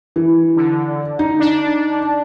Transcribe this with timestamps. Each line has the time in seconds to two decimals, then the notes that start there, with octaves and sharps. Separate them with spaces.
0.16 E3
0.56 D3
1.19 D#4
1.39 D4